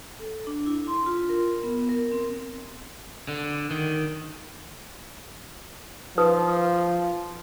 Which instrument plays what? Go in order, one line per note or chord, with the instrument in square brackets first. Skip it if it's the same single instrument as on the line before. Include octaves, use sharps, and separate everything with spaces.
[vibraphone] A4
D4
E4
C6
F4
A#4
B3
A#4
C4
[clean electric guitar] D3
D#3
[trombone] F3 [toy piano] D#4 B4 D#6